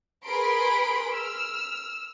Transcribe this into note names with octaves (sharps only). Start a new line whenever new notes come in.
G#4 A#4 B4 B5 C6 D7
E6 F6